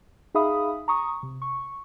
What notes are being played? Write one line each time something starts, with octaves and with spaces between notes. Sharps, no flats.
D#4 G#4 E5 F5 B5 D#6
A#5 C#6 D#6
C3
C#6